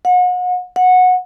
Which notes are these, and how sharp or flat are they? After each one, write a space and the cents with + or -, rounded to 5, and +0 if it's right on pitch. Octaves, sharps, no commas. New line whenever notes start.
F#5 -35
F#5 -15